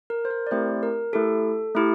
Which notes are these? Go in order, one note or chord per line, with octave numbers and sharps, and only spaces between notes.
A#4
C5
A#4
D5
A3 C4 E4 G4 C5
A#4
A3 E4 G4 A4
A3 E4 G4